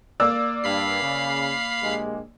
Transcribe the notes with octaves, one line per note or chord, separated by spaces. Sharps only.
A#3 D5 E6
G2 F5 B5 C7
C#3
A#1 G#3 G4